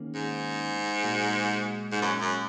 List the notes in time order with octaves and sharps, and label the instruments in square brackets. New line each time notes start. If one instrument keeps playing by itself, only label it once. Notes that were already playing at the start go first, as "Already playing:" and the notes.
Already playing: [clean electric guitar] D#3 A#3 C#4 G#4
[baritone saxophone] G#2
[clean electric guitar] A#2 G#3 F#4
[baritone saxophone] G#2
F#2
F#2